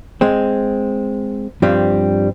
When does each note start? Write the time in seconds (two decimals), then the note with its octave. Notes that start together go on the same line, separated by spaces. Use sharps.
0.21 G#3 C4
1.62 G2 F3 G3 C4